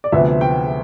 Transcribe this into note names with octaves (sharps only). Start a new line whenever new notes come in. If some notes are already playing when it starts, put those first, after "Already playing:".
D5
D2 C3 F3 B3 E5
G5